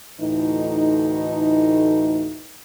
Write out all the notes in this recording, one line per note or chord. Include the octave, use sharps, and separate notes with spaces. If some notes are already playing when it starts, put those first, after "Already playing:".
D2 A2 E3 D#4